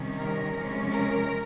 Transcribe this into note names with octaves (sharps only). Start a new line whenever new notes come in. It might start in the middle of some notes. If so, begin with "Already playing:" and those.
Already playing: C3 D#3 G3 C#4
A#4
C3 F3 G#3 C#4
A#4